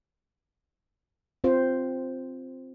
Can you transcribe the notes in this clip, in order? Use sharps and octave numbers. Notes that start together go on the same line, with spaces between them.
C4 F4 C5